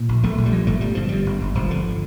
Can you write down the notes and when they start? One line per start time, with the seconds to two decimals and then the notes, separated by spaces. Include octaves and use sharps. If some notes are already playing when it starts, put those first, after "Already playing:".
Already playing: A#2
0.09 A#1
0.23 A#1 A3
0.38 A#1
0.46 G3
0.52 A#2
0.67 G1 A3
0.81 G1 G3
0.95 G2 F3
1.09 G2 G3
1.26 G1
1.41 G1
1.55 G1 F3
1.71 D3